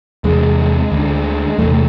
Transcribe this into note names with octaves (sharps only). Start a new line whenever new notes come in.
E2 C3 G#3
D2
D3
E2 C3 A3
A3